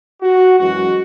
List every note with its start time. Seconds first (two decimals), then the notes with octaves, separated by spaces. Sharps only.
0.22 F#4
0.59 F#2 E3 G#3 F#4